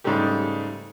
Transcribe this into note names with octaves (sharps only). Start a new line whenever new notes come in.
G#2 C#3 G3 A3 G4